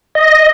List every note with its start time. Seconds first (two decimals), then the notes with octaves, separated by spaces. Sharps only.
0.15 D#5